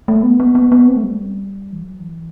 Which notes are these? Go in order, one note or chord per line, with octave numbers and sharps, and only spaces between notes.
A3
B3
B3
B3
B3
C4
A3
G3
E3
F#3
E3